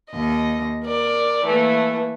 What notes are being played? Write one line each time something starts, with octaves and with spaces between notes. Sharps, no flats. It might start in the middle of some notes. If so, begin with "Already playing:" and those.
D#2 D#5
A#4 D5
E3 A3 A#3